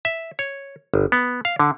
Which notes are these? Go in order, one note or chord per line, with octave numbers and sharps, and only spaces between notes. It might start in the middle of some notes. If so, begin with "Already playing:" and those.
E5
C#5
G1
B3
F5
D3